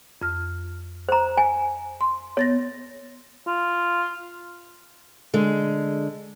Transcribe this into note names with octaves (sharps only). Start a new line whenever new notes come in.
F2 F6
C5 A#5
G#5
C6
B3 C#5 A6 A#6
F4
D3 G#3